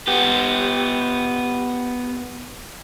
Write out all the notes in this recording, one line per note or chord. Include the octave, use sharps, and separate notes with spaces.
B3 G4